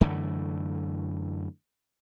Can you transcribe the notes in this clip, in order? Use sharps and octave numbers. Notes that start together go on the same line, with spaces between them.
F#2 D3 E3 A3